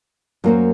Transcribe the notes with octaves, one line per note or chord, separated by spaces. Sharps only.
F#2 F#3 A#3 F#4 C5